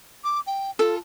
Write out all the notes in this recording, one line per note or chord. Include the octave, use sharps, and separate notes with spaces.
D6
G5
F4 A4